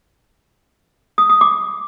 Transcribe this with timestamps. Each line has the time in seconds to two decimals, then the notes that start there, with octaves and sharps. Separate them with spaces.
1.18 D#6
1.30 D#6
1.41 D6